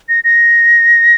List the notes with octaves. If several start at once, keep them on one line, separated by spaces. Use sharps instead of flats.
A#6
A#6